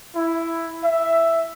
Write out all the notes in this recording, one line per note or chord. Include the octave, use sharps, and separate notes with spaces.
E4
E5